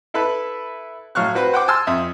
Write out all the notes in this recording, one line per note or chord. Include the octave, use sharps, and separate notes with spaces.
E4 A4 B4 B5
A2 F#3 F5 C#6 F6 F#6
C4 F#4 B4
C5 F#5 G5 D6
G#5 A5 C6 E6
F2 E5 D#6